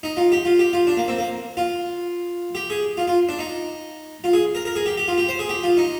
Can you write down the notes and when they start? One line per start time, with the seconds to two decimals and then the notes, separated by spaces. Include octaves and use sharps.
0.03 D#4
0.17 F4
0.32 G4
0.45 F4
0.59 G4
0.73 F4
0.87 D4
0.97 A#3
1.08 C4
1.19 A#3
1.57 F4
2.55 G4
2.70 G#4
2.97 F4
3.07 F4
3.29 D4
3.39 D#4
4.24 F4
4.33 G#4
4.55 A#4
4.65 A#4
4.76 G#4
4.86 G4
4.97 G4
5.08 F4
5.18 G4
5.28 C5
5.39 G#4
5.49 G4
5.63 F4
5.77 D#4